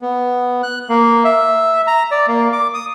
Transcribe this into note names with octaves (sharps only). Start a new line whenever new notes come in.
B3
F#6
A#3
E5
A#5
D5
A#3
D6
D#6